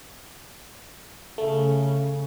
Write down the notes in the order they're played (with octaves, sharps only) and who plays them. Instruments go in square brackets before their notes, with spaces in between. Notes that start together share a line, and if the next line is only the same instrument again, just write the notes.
[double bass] C#3 [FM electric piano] A3